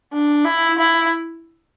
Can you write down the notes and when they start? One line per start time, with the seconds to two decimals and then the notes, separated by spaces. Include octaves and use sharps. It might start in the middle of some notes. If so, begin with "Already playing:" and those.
0.12 D4
0.45 E4
0.78 E4